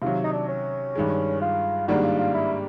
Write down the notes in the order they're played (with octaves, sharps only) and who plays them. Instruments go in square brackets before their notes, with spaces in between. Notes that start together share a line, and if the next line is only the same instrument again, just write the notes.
[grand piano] C3 D#3 F#3 [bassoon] F4
[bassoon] D#4
D4
C#4
[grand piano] G2 D#3 G#3
[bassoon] F4
[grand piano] G#2 D#3 G3 A#3 D4 [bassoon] F#4
[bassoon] F4
F4
E4